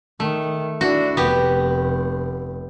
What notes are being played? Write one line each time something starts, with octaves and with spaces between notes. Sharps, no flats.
D#3 A3
D4 E4 F#4
F1 B3 G4